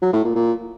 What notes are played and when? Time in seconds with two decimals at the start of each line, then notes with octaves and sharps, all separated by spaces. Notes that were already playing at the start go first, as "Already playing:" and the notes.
0.02 F#3
0.13 A2
0.24 A#2
0.35 A#2